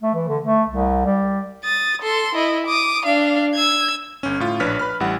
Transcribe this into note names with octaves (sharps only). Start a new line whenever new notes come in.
A3
E3
D3
A3
C2
G3
D#6 A6
A4 C6
E4 D#5
D6 D#6
D4 F5
E6 G#6
G1 C#4
A2 F4
A#1 D4 B4 C#5 F6 B6
B4 B5 F6
A1 G3 E4 F#5